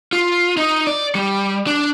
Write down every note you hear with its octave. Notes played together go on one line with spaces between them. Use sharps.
F4
D#4
D5
G3
D4